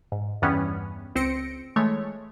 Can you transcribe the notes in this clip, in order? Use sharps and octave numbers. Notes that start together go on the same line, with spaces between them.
G#2
E2 G2 E3 G3 B3 C#4
C#2 C4 C5 A#6 C#7 D7
E3 G#3 A3 C#5